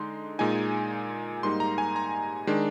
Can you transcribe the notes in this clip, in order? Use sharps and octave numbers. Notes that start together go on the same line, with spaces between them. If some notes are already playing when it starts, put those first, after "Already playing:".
Already playing: D3 G#3 D#4 C6
A#2 G#3 D#4 G#5
G#2 G3 A#3 D#4 C6
A#5
G#5
A#5
D#3 G#3 D4